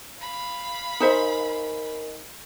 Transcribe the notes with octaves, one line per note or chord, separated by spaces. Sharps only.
F5 B5
D#4 A#4 C5 D#5 E5 G#5